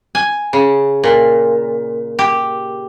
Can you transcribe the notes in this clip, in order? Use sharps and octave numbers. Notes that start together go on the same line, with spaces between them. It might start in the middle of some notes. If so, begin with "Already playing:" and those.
G#5
C#3
A#2
G4